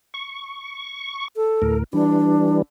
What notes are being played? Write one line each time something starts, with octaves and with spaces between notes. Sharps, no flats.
C#6
A4
D2 A2 A#4
E3 G3 D4